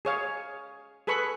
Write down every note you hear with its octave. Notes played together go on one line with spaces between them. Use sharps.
G#4 C#5 F5
G#4 A4 B4 B5 C#6